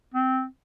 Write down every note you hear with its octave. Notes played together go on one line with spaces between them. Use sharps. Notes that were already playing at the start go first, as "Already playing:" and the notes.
C4